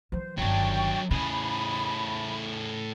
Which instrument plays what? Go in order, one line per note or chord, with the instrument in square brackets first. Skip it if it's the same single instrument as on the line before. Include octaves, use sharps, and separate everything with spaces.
[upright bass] E3 F#3 [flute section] C5
[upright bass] G1 D#3 [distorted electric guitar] F#3 D4 [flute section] G5 C#6
[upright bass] E2 C#3 [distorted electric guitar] A2 G#4 [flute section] B5